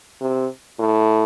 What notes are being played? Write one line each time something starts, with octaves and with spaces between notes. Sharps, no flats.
C3
A2